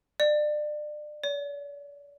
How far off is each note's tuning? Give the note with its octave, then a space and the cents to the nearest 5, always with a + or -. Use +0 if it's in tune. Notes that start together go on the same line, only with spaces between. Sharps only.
D5 +30
D5 -45